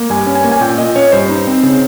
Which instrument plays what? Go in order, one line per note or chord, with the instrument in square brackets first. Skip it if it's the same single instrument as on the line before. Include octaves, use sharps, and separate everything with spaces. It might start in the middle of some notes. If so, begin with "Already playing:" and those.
Already playing: [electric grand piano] A#3
G2 G#5
C#4
G#5
A#3
G#5
A#2 G5
A#2 D#5
C#4 C#5
G2 C5
D#4
C4
C#3